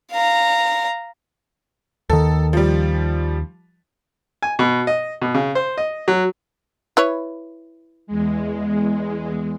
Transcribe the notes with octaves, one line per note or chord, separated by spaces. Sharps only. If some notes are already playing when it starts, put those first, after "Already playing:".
F5 A#5
D#2 D#3 A4
F3 G3
G#5
B2
D#5
B2
C#3
C5
D#5
F#3
E4 B4 C#5
E2 G#3